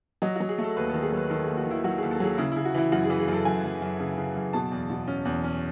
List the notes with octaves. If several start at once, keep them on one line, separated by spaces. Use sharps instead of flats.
F#3 D#5
F#4
F#3
G#4
A3 A4
D#2 B4
D#3 A4
G#4
F#3 B4
D#3 A4
D#2 G#4
F#4
D#3
E4
F#3 F#4
D#2 G#4
A4
F#3 G#4
C#3 E4
C#3 E4
F#4
E3 E4
F#2 F#4
G#4
E3
G#4
F#2 A4
F#2 G#5
F#2
F#2
C#3
C#3
F#2
B2 A5
E2
B2
C#4
E2
C#4